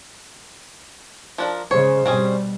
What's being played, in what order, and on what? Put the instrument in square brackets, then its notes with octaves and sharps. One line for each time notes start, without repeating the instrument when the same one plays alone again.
[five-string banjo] F3 D4 A#4
[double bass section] C#3 G#3 [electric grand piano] C5 [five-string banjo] C#5
[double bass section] B2 G3 [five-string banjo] C4 C#4 G#4